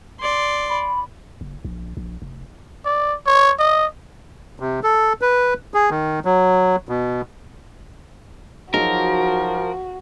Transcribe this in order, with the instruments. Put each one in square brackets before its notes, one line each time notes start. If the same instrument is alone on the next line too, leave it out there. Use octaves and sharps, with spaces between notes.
[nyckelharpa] D5 C6
[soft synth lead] B5
[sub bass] F#1
A#1
A#1
F1
[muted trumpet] D5
C#5
D#5
[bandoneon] C3
A4
B4
G#4
D#3
F#3
B2
[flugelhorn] F3 [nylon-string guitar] F#3 D#4 G#4 [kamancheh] F#4 [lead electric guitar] A#4